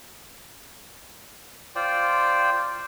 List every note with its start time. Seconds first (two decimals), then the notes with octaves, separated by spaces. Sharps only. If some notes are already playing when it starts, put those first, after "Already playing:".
1.75 F4 C5 D5 G5